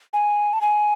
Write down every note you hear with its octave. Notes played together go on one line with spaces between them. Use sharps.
G#5
A5
G#5